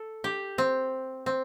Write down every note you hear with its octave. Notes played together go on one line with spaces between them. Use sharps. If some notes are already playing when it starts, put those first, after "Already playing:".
Already playing: A4
G4
C4
C4